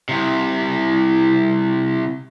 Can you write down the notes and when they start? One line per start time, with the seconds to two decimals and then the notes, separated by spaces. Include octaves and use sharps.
0.09 C2 C3